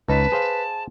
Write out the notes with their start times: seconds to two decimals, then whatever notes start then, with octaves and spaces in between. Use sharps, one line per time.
0.08 C#2 D#4 B4 A5
0.32 G#4 C5 F5